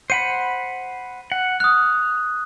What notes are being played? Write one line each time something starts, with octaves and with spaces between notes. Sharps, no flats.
C5 F#5 B5 D#7
F#5
D#6 F6 F#6